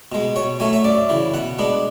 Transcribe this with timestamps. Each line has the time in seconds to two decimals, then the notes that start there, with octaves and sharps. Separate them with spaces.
0.12 B2 G#3
0.36 B2 C#5
0.60 F#3 A3 C#4 G#5
0.73 E5
0.84 F#2 D5
1.09 C#3 E3
1.34 B2 F#5
1.59 G#3 B3 D4